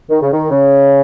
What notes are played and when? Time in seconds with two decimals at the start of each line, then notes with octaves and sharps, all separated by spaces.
0.09 D#3
0.21 C#3
0.32 D#3
0.51 C#3